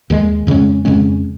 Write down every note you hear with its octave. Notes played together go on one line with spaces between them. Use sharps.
D#2 D#3 G#3
F2 C#3 G#3 C#4
F2 C#3 G#3 C#4